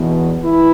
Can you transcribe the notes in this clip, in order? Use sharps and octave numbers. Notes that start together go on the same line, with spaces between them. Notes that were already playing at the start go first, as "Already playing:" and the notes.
Already playing: E2 B2
E3 E4